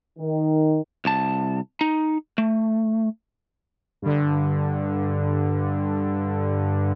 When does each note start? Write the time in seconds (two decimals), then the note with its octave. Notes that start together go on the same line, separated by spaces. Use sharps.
0.18 D#3
1.05 C2 A5
1.81 D#4
2.38 A3
4.02 G2 D3